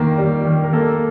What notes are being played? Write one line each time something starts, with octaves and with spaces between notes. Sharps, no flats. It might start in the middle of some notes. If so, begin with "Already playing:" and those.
Already playing: D#3 A#3
G3
D#3
A#4
A#3 A4